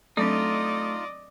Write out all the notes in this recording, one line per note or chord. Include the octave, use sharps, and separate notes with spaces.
F#3 A3 C4 D4 D#4 F4 D5 D#5